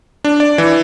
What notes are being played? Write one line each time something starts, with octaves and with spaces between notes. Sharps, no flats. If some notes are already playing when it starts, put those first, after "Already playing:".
D4
D5
E3